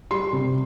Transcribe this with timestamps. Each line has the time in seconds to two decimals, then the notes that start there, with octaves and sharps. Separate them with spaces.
0.11 G3 C6
0.33 C3